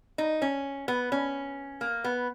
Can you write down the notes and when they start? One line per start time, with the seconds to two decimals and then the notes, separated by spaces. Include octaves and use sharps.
0.18 D#4
0.42 C#4
0.88 B3
1.12 C#4
1.81 A#3
2.04 B3